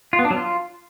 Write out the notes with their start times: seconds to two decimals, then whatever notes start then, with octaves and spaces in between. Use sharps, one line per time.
0.13 F4
0.19 B3
0.25 D4
0.31 F#3
0.36 F4